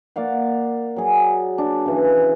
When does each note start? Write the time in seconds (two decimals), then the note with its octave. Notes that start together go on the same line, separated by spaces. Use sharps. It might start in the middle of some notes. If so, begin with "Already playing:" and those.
0.16 A#3 D5 F5 F#5
0.96 F#3 G#4
1.58 D4
1.86 C#3 E3 B4